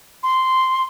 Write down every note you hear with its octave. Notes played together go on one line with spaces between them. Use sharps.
C6